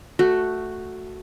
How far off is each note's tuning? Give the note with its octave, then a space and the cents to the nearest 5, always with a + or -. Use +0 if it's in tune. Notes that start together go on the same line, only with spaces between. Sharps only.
A3 +0 F#4 +0